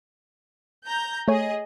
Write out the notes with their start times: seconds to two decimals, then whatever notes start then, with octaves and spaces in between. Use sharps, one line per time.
0.85 A#5 G6
1.28 A3 G#4 C#5 D#5